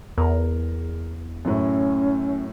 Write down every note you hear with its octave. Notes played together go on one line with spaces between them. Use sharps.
E2 A#4
F#2 A2 C#4